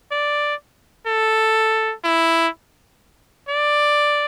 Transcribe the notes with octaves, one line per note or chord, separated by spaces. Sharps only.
D5
A4
E4
D5